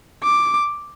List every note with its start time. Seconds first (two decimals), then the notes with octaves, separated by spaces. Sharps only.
0.23 D6